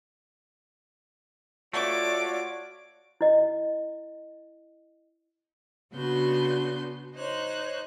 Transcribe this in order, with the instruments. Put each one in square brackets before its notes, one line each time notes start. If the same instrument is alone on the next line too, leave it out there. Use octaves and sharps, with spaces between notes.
[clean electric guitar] A3 [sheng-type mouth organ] F4 F#4 C#5 [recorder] D5 [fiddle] D6
[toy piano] E4 D#5
[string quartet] C#3 B3 D4 F#4 C6 G6
D#4 C5 C#5 C6 F#6